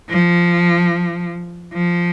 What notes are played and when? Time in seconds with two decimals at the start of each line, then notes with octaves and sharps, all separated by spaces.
0.10 F3
1.74 F3